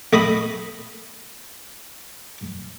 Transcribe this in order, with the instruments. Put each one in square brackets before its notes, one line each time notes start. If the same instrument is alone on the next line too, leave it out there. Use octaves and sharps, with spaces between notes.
[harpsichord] A3 D#5 B5 D#6